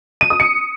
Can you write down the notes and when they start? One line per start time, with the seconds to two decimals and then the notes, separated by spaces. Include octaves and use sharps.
0.21 D#7
0.30 D#6
0.40 C#7